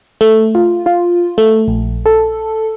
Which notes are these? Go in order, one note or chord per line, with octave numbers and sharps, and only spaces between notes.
A3
F4
F4
A3
A#1
A4